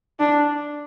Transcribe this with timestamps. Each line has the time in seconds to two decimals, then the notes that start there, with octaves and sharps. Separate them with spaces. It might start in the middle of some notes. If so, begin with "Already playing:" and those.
0.20 D4